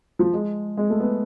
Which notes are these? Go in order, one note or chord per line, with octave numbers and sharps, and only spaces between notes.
F3
G#3
G#3
A3
B3